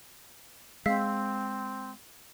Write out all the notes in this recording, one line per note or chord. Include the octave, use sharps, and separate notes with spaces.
G#3 C4 F5 E6 B6